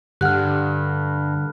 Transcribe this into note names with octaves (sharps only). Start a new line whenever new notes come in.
G2 D3 G4 F#5 F6 F#6